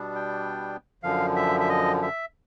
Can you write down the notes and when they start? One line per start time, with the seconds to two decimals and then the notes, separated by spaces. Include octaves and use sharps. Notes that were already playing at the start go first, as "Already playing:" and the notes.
Already playing: B2 G3 B3 D4
0.15 G5
1.03 F#2 D3 F3 F5
1.36 E5
1.60 E5
1.70 D#5
2.02 E5